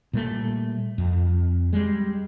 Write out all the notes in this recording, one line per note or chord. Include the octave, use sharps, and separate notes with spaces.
A#2 G3 A3
F2
G3 G#3